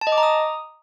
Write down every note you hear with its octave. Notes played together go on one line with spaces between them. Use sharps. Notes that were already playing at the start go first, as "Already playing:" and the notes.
A5
D#5
D6
A#5
D#6